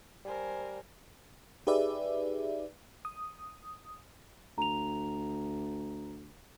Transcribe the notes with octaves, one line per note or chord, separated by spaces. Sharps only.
G3 A#4 C5 G#5
D#4 G4 G#4 B4 D5 E5
D#6
D2 A#5 F7